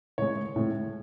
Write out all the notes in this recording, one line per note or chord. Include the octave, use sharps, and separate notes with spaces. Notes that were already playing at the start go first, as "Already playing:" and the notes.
A2 G#3 C#5
A2 G#3